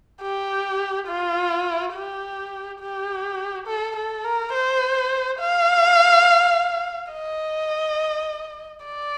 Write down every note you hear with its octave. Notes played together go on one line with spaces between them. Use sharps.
G4
F4
G4
G4
A4
A4
A#4
C5
F5
D#5
D5